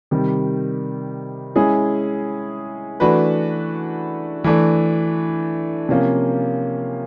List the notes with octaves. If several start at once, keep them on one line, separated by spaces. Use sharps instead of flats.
C3 D#3 G3
G#3 C#4 E4 G#4
E3 A3 D4 F#4 B4
E3 A3 D4
C3 F3 A#3 C#4 F4